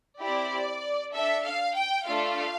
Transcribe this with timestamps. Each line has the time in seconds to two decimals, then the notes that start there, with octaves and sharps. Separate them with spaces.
0.20 C4 E4 G4 D5
1.14 D4 A4 E5
1.45 F5
1.76 G5
2.08 A3 D4 F4 A4 F5